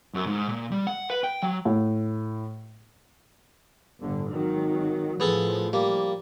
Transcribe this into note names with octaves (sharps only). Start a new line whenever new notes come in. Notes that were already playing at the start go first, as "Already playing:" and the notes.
F#2
G#2
A#2
G3
F#5
B4
G5
F#3
A2
G1 A2 D3
G#1 D#3 F#3
A2 F3 B3 G#4 A4
G3 A#3